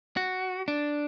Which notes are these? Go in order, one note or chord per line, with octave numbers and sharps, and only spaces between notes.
F#4
D4